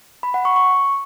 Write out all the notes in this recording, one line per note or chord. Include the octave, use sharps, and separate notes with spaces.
B5
F#5
C#6
C#6